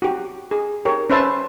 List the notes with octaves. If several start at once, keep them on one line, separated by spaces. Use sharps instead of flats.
F#4 G4
G#4
G4 A#4 C#5
C#4 B4 C5 E5 A5